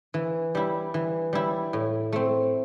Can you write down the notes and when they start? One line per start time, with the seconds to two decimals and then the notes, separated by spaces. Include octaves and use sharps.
0.14 E3
0.55 G3 E4
0.94 E3
1.33 G3 E4
1.73 A2
2.13 A3 C4